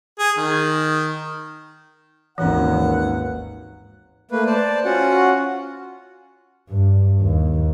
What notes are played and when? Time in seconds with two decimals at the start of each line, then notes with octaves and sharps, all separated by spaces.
0.19 G#4
0.37 D#3
2.38 G#1 D#2 E3 C#4 D#4 B4 F#5 A#5
4.31 A3 A#3 B4
4.46 C5 D5 A5
4.85 C#4 F4 F#4 F#5
6.69 G2
7.21 D#2